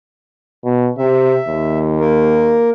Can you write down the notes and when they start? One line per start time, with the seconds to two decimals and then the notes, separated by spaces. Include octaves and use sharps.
0.65 B2
0.98 C3 E5
1.48 D#2
2.00 A#3 A#4